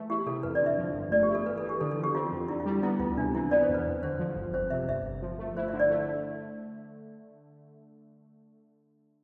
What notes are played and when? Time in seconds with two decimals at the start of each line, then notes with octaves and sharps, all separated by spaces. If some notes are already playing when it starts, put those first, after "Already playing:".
Already playing: E3 A3
0.10 E4 G4
0.27 C3 A4
0.43 F2 B4
0.55 D5
0.61 D3
0.66 E5
0.78 F3
0.94 G1
1.12 A3 D5
1.23 G4
1.30 E4 A4
1.46 E3 B4
1.58 A4
1.64 E3
1.69 G4
1.81 D3 A4
1.91 A4
1.97 F3
2.04 G4
2.15 C4 F4
2.32 F2
2.48 D3 E4
2.60 F4
2.65 G3
2.71 E4
2.82 B3 E4
3.00 D2 F4
3.18 C3 D4
3.35 E3 E4
3.51 B3 D5
3.63 C5
3.69 E2
3.74 B4
3.86 F2
4.03 D3 C5
4.19 F3
4.36 G1
4.53 F2 C5
4.70 C3 E5
4.89 G1 E5
5.06 G1
5.22 F3
5.39 A3
5.57 E4 C5
5.68 E5
5.73 D3
5.79 D5
5.90 A3